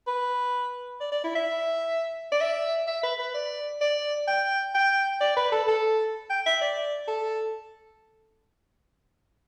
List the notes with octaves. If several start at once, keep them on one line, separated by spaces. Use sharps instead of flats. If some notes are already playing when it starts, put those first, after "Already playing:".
B4
D5
D5
E4
E5
D5
E5
E5
B4
B4
D5
D5
G5
G5
D5
B4
A4
A4
G5
E5
D5
A4